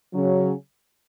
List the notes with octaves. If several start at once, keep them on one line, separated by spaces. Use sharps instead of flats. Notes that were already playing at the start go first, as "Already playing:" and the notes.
C#3 F#3 C#4